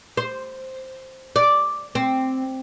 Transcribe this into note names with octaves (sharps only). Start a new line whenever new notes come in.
C5
D5
C4